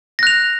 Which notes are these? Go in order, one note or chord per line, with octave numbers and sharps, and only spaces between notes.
F#6 A#6 F7